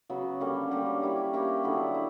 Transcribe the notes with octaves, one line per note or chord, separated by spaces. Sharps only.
C#3 F#3 B3 F#4
D3 G3 A#3 C#4
D3 G3 A#3 C#4
A#3 E4 G4 C#5
A#3 E4 G4 C#5
D3 F#3 B3 E4
E4